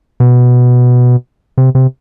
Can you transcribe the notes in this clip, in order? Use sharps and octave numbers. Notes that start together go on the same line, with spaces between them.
B2
C3
C3